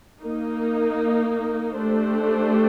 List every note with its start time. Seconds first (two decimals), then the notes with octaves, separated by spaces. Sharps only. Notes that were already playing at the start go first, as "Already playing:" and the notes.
0.20 A#3 D#4 A#4
1.78 A3 D4 G4 C5